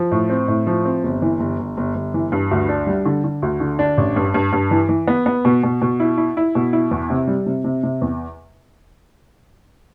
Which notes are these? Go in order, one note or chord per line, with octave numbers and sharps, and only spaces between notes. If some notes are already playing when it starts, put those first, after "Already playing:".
Already playing: F3
A2
C4
A2
F3
C4
G1
E3
G1
G1
G1
G1
E3
G2
D2
D4
G3
D3
D3
D2
D3
D4
A1
G2
G2
G2
E3
E3
B3
B3
B2
B2
B2
E4
E4
E4
B2
E4
E2
C3
G3
C3
C3
C3
E2